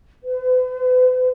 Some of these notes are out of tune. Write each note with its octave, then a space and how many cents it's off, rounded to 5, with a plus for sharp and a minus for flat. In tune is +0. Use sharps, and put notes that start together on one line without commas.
B4 +45